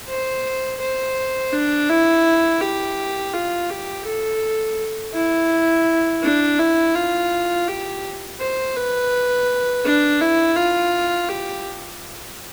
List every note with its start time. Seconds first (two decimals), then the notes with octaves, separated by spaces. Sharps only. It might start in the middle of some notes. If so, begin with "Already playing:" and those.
0.08 C5
0.81 C5
1.53 D4
1.89 E4
2.61 G4
3.34 F4
3.70 G4
4.05 A4
5.14 E4
6.23 D4
6.59 E4
6.95 F4
7.68 G4
8.40 C5
8.77 B4
9.85 D4
10.21 E4
10.57 F4
11.29 G4